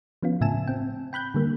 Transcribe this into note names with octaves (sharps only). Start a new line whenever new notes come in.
F3 B3 C#4 F4
A2 C#3 E5 G#5 A5 E7
C4 G5
G5 B5 F#6 G6
D3 G3 A#3